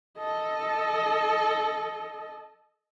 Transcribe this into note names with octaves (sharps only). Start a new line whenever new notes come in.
A4 D#5